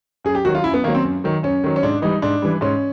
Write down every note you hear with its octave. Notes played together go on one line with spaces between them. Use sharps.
F#2 G#4
G4
D#3 F#3 F#4
F4
F#2 E4
B3
D#3 F#3 A#3
C4
F#2
D#3 F#3
F#2 C#4
D#3 F#3
C#4
G#2 D4
E3 G3 D#4
G#2 D4
E3 G3
G#2 C#4